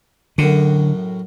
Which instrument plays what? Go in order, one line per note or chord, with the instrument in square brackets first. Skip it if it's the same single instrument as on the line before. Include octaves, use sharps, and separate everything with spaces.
[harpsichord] F#2 A2 F#4 [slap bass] D3